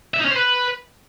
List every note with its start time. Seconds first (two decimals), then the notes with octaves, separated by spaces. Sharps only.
0.14 E5
0.19 D#4
0.25 C#4
0.31 C5
0.36 B4